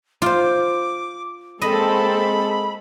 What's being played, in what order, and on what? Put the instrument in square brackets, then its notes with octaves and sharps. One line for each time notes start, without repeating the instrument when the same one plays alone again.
[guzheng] F4 C5 [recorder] D6
[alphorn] G#3 [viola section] A#3 C4 A4 [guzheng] D#5 [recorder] B5